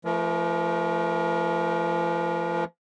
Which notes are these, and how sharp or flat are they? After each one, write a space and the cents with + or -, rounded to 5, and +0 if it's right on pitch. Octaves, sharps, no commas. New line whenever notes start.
F3 -35 A3 -5 A#4 +30